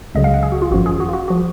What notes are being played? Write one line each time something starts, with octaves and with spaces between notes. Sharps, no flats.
C#2 C#3 F#3 D#5
F5
F#5
G#4
F#4
F4
G#1 F#2 F3 F#4
G#4
F#4
F4
F#4
F3 F#4